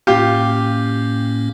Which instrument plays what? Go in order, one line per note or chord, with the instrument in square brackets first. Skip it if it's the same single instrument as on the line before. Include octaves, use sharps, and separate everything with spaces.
[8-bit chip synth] A2 A#3 C#4 [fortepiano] F4 G4